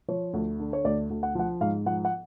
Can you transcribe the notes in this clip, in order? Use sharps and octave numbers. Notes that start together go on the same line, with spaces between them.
F3 C#5
D2
D3
C#5
D2 D5
D2
F#5
F3 F#5
G#2 F5
F3 F#5
F#5